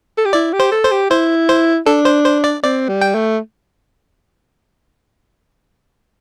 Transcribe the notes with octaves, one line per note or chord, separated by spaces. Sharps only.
A4
G4
E4 D5
G4
C5
A4
C5
G4
E4 C5
C5
D4 A4
C5
C5
D5
C4 D5
G3
G5
A3